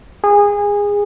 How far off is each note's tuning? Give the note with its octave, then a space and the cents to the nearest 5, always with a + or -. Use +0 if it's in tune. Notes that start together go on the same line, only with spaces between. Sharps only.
G#4 -25